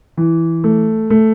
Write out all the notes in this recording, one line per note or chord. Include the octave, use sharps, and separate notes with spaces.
E3
A3
A3